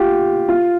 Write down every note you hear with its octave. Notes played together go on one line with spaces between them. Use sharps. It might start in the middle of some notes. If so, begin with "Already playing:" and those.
Already playing: F4 G4
F4